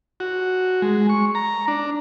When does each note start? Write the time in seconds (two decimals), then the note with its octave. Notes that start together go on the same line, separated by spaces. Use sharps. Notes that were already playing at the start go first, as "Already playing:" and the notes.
0.20 F#4
0.82 G#3
1.09 C#6
1.35 A#5
1.68 D4